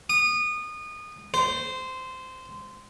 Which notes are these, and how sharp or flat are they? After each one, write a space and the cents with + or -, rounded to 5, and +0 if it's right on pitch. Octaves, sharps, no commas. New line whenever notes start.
D#6 -25
C5 -15